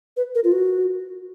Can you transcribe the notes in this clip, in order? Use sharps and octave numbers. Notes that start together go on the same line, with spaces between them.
B4
A#4
F4
F#4